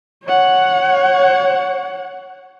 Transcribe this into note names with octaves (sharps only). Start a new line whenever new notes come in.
C#5 F#5